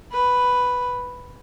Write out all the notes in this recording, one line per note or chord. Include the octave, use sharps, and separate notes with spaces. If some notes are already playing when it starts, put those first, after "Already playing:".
B4